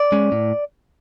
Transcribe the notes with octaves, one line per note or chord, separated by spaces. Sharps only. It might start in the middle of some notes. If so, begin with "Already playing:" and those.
Already playing: D5
G#3 C#4
A2